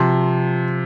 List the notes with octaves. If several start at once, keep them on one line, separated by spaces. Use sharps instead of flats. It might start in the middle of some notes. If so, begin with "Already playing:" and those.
Already playing: C3 F3 C6